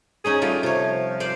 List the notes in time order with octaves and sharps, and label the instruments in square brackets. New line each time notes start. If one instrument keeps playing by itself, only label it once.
[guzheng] C#4 D#4 C#5 [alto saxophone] G#4
[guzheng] G3 A3 [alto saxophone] F4
[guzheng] C3 C#5 [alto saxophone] F3
[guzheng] C5 D5 F5